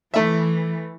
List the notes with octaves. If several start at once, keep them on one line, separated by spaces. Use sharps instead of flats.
E3 A3 E5